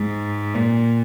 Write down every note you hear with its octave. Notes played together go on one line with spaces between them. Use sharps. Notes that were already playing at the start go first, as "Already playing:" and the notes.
Already playing: G#2
A#2